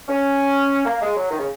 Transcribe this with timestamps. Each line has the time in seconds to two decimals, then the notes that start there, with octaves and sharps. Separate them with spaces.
0.09 C#4
0.85 A#3
1.01 G#3
1.16 F#3
1.31 D#3
1.39 C#3